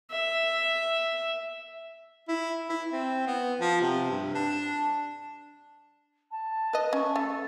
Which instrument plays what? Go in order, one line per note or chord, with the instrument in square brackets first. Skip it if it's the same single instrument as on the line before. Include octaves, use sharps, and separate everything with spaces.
[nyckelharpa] E5
[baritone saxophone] E4
E4
C4
B3
F3
C3
G2
D4
[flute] A5
[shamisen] B4 D#5
[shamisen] C#4 [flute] C#6
[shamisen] A3 [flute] A4